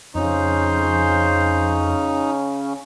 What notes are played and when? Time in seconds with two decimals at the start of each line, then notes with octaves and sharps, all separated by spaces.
0.15 F2 C#3 C#4 D#4 C5